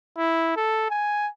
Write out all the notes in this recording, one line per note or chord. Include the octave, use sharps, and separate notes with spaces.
E4
A4
G#5